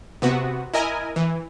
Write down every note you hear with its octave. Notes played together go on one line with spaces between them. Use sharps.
C3 B3 F#4
E4 A#4 D#5 G#5
E3